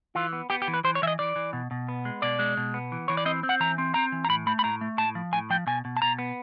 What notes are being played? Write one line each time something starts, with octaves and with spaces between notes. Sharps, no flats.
E3 F4
B3
B3 G4
G4
E3
B4
E3 C5
C#5
E3 E5
D#5
E3 D5
E3
B2
B2
B3
G#3
B2 D5
G#3
B2
B3
E3
E3 C#5
D5
C4 D#5
C4
F#5
E3 A#5
C4
C4 A#5
E3
A#5
A2 B5
A3 B5
B5
A2 A#5
A3
A2 A5
F3
A2 G#5
F3 G5
B2 G#5
B2
A5
B2 A#5
B3